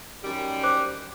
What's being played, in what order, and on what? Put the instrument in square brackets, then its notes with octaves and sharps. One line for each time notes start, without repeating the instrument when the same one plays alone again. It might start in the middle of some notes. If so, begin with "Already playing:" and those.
[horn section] F#2 D#3 G3
[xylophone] C5 D6 F#6